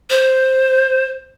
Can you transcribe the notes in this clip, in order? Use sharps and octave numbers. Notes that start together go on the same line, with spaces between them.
C5